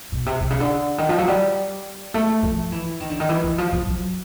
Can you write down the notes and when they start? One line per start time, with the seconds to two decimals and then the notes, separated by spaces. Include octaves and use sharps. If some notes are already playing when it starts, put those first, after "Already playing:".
0.12 B2
0.26 C3
0.41 C3
0.50 C#3
0.60 D3
0.98 D#3
1.09 F3
1.18 F#3
1.28 G3
2.14 A3
2.43 F3
2.72 E3
3.00 D#3
3.10 D3
3.20 D#3
3.29 E3
3.44 E3
3.58 F3
3.73 F3
3.87 F#3